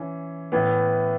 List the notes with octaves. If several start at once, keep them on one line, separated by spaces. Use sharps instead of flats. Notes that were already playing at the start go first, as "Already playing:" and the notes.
Already playing: E3 C#4
A2 E3 B3